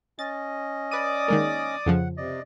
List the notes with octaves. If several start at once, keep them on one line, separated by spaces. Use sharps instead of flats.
C#4 D#5 A6
B4 D5 D6 D#6 D#7
D#3 G#3 A#3
F2 C#3 F3 F#5
C3 D5 D#5